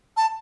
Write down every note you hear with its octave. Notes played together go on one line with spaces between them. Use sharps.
A5